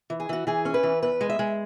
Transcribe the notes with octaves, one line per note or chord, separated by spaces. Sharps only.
E3
G#4
E3 F#4
E3 G#4
C#4
B4
E3
E2 B4
G#3
E5
G#3